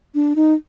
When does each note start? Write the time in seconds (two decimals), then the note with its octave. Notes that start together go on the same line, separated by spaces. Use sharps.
0.15 D4
0.36 D#4